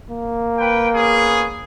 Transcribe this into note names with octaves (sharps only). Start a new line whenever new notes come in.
A#3
B4 G5
B3 C#4 G#4